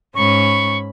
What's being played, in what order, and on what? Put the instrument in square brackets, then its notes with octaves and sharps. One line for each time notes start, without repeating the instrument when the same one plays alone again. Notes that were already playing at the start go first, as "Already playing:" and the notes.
[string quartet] G#2 C#4 B5 [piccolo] C#6